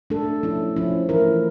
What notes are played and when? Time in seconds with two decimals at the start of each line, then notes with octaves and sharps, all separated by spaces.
0.10 A3 D4 A4
0.43 F3 C#4 E4
0.76 F3 C#4 E4
1.09 E3 A3 E4 A#4